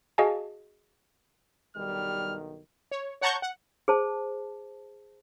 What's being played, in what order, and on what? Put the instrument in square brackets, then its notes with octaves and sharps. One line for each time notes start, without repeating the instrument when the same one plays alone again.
[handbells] F#4 G#4 D#5 F5 G#5 A5
[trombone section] B1 G2 D#3 [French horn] G3 [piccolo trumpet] F6
[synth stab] C#5
C#5 F#5 A5 A#5 C#6 G6
F#5
[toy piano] G#4 C5 A5